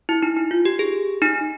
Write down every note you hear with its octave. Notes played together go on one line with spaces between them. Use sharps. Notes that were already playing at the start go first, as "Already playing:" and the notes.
E4
D#4
D#4
F4
G4
G#4
D#4